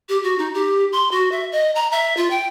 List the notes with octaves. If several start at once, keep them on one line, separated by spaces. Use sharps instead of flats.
G4
F#4
D#4
G4
C6
F#4
E5
D#5
A#5
E5
F4
G5